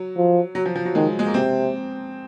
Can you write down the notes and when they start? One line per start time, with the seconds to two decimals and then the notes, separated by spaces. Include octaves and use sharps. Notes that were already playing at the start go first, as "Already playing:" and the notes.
Already playing: F#3
0.16 F3
0.55 F#3
0.66 F3
0.76 F3
0.85 F#3
0.95 D#3 G#3
1.19 G#3
1.27 A#3
1.34 C3 C4